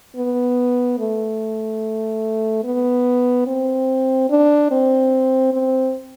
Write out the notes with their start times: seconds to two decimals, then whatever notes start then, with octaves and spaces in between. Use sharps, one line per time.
0.16 B3
0.99 A3
2.64 B3
3.47 C4
4.30 D4
4.71 C4
5.53 C4